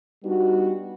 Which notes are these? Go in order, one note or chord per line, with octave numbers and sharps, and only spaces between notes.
G3 B3 D4 D#4 F#4